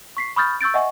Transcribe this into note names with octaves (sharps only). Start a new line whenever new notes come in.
C#6 B6 C7
B5 C#6 D#6 F6 G6 A6
C#6 E6 G6 A6 D7
D#5 E5 F#5 G#5 C#6